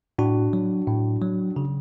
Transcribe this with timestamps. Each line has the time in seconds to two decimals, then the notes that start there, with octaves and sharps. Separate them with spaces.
0.18 A2 D4 F#4
0.53 F#3
0.87 A2
1.22 F#3
1.56 C#3